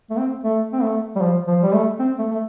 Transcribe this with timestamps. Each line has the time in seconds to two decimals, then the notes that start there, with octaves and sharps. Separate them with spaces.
0.10 A3
0.17 C4
0.44 A3
0.73 C4
0.82 A3
1.16 G3
1.21 F3
1.47 F3
1.62 G3
1.74 A3
1.99 C4
2.19 A3
2.31 A3